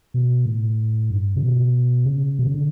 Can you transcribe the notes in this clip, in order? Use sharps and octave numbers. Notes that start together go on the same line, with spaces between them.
B2
A2
G2
C#3
B2
C#3
B2
C#3
D3